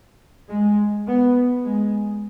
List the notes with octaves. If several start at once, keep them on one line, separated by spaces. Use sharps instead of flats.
G#3
B3
G#3